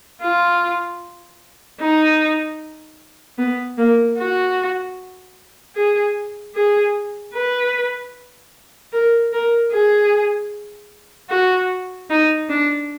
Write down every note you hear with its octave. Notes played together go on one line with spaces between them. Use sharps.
F4
D#4
B3
A#3
F#4
G#4
G#4
B4
A#4
A#4
G#4
F#4
D#4
D4